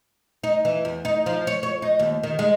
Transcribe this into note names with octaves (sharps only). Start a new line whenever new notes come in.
D#4
E3
E2
D#4
F3
C#5
C#5
D#4
D#2
D#3
G#3